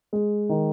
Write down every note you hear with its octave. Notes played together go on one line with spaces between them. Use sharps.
G#3
D#3